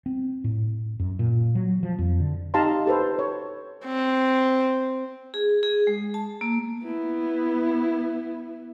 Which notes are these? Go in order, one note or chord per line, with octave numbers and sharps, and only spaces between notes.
C4
A2
F#2
A#2
F#3
F3
F2
D3
D#4 G4 F5 A5 A#5 C6
G4 A4 B4 C5
C#5
C4
G#4
G#4
G#3
A5
A#3
B3 E4